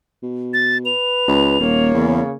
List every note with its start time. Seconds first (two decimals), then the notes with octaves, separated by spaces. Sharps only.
0.23 B2
0.54 A6
0.86 B4 F7
1.28 C#2
1.60 D#1 A#3 C#5
1.94 E2 C#3